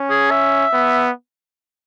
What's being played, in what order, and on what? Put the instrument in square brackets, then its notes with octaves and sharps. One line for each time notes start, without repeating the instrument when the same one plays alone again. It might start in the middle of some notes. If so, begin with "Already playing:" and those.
Already playing: [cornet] C#4
[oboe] G#4
E5
[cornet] B3